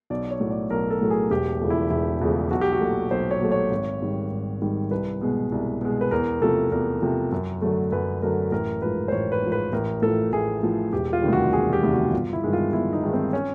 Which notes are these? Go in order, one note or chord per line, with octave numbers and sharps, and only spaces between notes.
B1 D5
C#5
A2 F#3 A3
D5
B1 A#4
A4
A2 F#3 A3
G#4
E1 G4
E2 C#3 F3 A3
E4
E1 E4
E2 C#3 F3 A3
B1 F#4
G4
F#4
A#2 F#3 A3
B1 C5
C#5
A#2 F#3 A3
C#5
G#1
G#2 D#3 G3
G#1
G#2 D#3 G3
C2 B4
B2 G#3
C2
B2 G#3
B4
E2 A#4
C3 F3 A3 A4
E2 A#4
C3 F3 A3
F#2
D3 F#3 A3
F#2 B4
D3 F#3 A3 A#4
A1 A#4
G#2 F3 B4
C5
A1 C#5
B4
G#2 F3
B4
A1 A#4
A2 F3 A4
A1 G#4
A2 F3
E1 G4
F4
D2 C3 D#3 G3
F#4
E1 G#4
G4
D2 C3 D#3 G3
F#4
G1 F4
E4
G2 D#3 G#3
F4
G1 E4
D#4
G2 D#3 G#3
C4
C#4